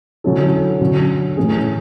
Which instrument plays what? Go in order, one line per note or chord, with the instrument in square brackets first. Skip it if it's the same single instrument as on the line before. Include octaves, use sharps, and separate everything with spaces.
[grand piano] D3 F#3 C#4 E4 A4
D3 F#3 C#4 F#4
A2 E3 A3 C#4 G#4